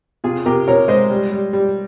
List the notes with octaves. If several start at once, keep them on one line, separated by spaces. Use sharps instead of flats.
C3 F4 G#4
C3 G4 A#4
C3 A#4 C#5
G#3 C5 D#5
G3
G3
G3